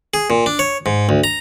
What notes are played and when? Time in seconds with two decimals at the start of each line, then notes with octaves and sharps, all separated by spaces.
0.14 G#4
0.30 A#2
0.46 D4
0.59 C#5
0.86 G#2
1.09 D2
1.24 A#5